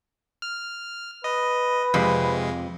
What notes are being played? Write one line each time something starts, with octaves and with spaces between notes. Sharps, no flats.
F6
B4 D#5
F2 C3 G#3